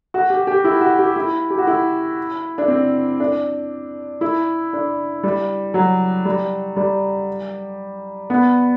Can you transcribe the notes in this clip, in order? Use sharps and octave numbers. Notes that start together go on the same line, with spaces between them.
F#4
G4
G4
E4
F#4
G4
E4
G4
F#4
E4
D4
C4
D4
E4
D4
G3
F#3
G3
G3
B3